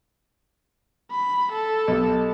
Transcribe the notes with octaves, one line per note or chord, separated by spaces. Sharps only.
B5
A4
B1 G4